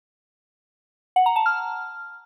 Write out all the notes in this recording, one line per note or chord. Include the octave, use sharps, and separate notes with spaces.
F#5
A#5
A5
F6